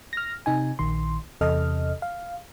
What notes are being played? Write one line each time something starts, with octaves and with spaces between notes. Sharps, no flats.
F6 A#6
C3 D#4 G#5
A#1 D#3 C6
E2 C3 A4 D#5 F6
F5